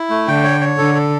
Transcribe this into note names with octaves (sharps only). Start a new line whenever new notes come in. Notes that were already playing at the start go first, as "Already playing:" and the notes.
Already playing: E4
A3
D3 G5
C#5
C#5
D3 A4
A4